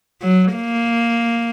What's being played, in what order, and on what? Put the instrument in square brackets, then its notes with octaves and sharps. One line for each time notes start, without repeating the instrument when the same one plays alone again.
[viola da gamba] F#3
A#3